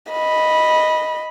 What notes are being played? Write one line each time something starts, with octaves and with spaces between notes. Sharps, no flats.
D#5 B5